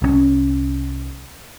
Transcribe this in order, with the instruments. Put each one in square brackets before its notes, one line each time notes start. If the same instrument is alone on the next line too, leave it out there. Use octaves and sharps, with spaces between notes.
[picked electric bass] C2 F3 C#4